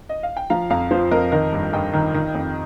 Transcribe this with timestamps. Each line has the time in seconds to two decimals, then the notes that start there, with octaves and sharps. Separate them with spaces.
0.09 D#5
0.23 F5
0.37 G5
0.50 F3 F5 A#5
0.70 F2 F5 A#5
0.91 F3 C5
1.11 F2 A#4 D#5
1.32 D#3 A#4 D#5
1.53 G2
1.73 G2 D#5 G5
1.93 D#3
2.14 D#3
2.35 F2